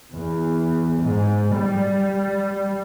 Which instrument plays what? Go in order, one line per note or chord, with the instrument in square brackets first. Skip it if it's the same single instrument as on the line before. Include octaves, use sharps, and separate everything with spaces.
[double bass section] E2
G#2
G3